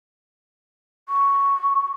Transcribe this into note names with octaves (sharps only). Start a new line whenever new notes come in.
C#6